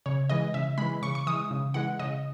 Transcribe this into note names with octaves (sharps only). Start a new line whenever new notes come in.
C#3 C#5
E3 G#3 D#5
C#3 E5
E3 G#3 B5
C#3 C#6
C#6
E3 G#3 D#6
C#3
E3 G#3 F#5
C#3 D#5